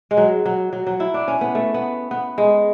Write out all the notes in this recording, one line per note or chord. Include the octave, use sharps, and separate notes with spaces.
G#3
F#3
F#3
F#3
F#3
E4
D4
C#4
B3
A3
B3
B3
G#3